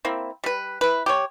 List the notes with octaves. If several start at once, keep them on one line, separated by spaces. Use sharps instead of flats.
A#3 C4 E4
G3 B4
E4 B4
G4 C5 C#5